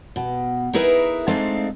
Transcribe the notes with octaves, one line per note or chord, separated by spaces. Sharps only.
B2
D#4 E4 G#4 A#4 B4 E5
G#3 A3 C4 D4 D#4 F5